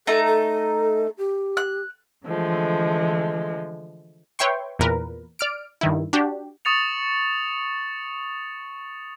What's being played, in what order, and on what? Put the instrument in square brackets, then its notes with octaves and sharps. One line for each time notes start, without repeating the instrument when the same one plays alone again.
[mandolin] A3 D#4 A#5 [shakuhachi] A4
[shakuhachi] A4
G4
[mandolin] F#6
[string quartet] D3 E3 F3 G#3 A3
[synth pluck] B4 C#5 E5 G5 C6 C#6
E2 A#2 A#4 B4
D5 F6 D7
G2 D#3 E4
D4 F#4 G4
[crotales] C#6 D#6 A6 C#7 F7